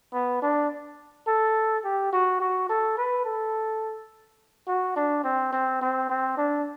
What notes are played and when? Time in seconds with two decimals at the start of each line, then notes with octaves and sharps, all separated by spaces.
0.13 B3
0.42 D4
1.27 A4
1.84 G4
2.13 F#4
2.40 F#4
2.69 A4
2.97 B4
3.25 A4
4.67 F#4
4.96 D4
5.24 C4
5.52 C4
5.81 C4
6.09 C4
6.37 D4